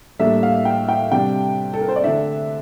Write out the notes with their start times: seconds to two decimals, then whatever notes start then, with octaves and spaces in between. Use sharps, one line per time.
0.19 A2 G3 A#3 D4 E5
0.43 F5
0.65 G5
0.89 G5
1.12 C3 G3 D4 G5
1.74 A4
1.81 A#4
1.88 C5
1.96 D5
2.04 D3 A3 D4 E5